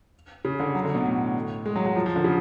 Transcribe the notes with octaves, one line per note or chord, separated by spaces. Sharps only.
C#3
D3
F#3
D3
B2
A2
G#3
F#3
F#3
F3
F3
D3
C#3